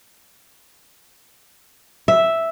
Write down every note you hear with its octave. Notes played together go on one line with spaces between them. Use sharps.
E5